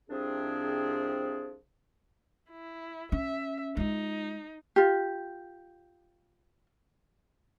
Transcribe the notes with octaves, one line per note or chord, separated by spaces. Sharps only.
C2 C3 F3 C4 D4 G#4
E4
C#4 E5
G#3 D#4 F4
F4 G4